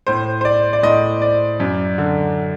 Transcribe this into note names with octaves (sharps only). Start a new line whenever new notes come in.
A2 C5
C5
D5
D5
A2 D#5
D5
F#2
D3